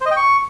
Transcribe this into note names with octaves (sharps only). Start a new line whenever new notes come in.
C5
D#5
G5
C#6